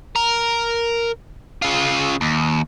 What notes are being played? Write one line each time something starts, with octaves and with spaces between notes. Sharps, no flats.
A#4
C#3 F4
D#2